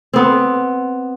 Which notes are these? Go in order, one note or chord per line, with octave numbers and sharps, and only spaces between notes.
B3 C4